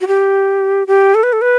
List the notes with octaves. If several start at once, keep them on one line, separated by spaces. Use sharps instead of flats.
F#4
G4
G4
A4
B4
A4
B4